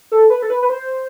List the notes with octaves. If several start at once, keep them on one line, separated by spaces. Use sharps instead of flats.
A4
B4
A4
B4
B4
C5